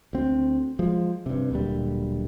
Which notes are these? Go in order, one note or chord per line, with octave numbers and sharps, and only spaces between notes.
D2 C4
F3 G#3
G2 C3
D1 A#2 D3 G3